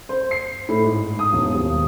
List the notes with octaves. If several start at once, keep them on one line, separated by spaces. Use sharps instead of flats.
C5
C7
A2
G#2
D#6
E1
D#1